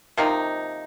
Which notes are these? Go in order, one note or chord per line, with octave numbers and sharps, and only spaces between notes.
C3 F3 A#3 D#4